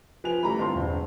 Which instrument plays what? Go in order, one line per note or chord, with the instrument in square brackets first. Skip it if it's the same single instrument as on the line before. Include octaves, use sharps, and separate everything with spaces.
[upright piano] F3 G#5 F7 [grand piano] B4
[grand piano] E3 G3 A3 [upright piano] A#5 B5
[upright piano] G1 C4 [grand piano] F4 A5 C6
[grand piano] E1